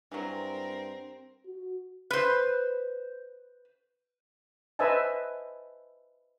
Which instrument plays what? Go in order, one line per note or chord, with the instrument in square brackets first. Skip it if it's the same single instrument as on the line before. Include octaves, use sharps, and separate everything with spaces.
[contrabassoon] G2 [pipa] E3 F#3 [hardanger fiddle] C4 A#4
[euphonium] F#4
[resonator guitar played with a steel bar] B4 C5
[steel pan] B4 C5 D#5 E5 G#5 A5